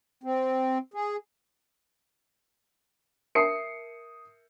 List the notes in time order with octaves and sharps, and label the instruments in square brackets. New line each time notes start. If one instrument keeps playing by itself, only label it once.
[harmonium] C4
G#4
[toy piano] A#4 E5 A5 [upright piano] D#6 C7 C#7